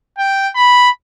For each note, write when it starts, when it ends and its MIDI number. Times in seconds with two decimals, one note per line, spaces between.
0.19 0.48 79
0.55 0.89 83